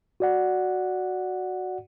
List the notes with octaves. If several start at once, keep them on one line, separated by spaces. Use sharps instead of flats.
F#4 D5 F#5